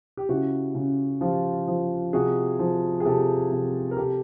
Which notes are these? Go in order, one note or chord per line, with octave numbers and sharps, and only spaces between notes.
G4
C#3 E4 F#4
C#3
F3 F4 G4
F3
C3 F#4 G#4
F3
G#4
C3 G4 A4
C3
A#4
C3 G4 A4